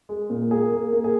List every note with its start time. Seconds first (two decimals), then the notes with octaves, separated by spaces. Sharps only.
0.09 G#3
0.30 A#2
0.51 A#3 G#4
0.72 A#3
0.93 A#3
1.04 G#4